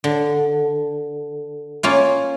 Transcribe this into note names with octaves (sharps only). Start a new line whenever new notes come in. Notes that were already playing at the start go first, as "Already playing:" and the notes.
D3
A#3 C#4 F4